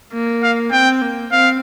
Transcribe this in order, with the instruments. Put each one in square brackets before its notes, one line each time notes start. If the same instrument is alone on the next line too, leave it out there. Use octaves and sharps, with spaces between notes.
[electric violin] A#3
[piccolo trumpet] F5
[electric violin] C4 [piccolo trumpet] G5
[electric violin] A#3
[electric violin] C4 [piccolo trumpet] F5